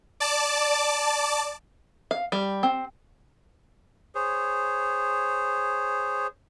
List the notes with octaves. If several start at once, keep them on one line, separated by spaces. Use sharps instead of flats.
D5 A5 D6
F5
G3
C4
G#4 C5 C#5